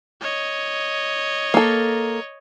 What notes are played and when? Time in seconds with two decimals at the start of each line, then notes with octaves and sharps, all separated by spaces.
0.21 C#5 D#5
1.54 A#3 A4